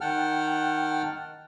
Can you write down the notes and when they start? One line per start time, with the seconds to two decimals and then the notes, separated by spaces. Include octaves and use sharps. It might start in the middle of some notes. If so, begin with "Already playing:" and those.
0.01 D#3 F#5 G5 A5 F6